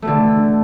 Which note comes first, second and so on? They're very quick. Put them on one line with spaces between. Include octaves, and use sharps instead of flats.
A3 B2 D3